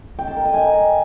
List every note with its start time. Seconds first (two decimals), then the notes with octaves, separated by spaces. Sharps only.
0.19 G5
0.27 A5
0.36 A#4
0.45 D#5
0.54 G#5